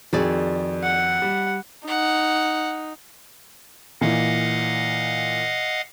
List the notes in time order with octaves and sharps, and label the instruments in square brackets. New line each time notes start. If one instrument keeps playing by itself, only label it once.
[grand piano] F2 D#3 [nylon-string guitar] F#4 G#4 D5
[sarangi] F#5
[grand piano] G3
[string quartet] D#4 [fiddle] F#5
[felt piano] A#2 E3 [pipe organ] D#5 F5 F#5